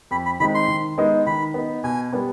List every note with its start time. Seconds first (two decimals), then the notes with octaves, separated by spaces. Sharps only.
0.11 F2 B5
0.26 B5
0.40 D#3 G#3 C4 D#4 B5
0.55 C6
0.68 D#3
0.98 G#3 B3 D#4
1.27 D#3 B5
1.54 B3 D#4
1.84 B2 G#5
2.12 G3 B3 D4